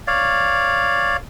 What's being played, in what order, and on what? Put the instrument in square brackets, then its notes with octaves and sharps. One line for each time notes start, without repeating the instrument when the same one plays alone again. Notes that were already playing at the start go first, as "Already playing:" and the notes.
[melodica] C#5 D5 F5